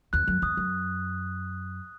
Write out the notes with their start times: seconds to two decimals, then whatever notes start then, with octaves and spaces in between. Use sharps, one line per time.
0.13 E2 F#6
0.27 F#2
0.42 E2 D#6
0.57 F#2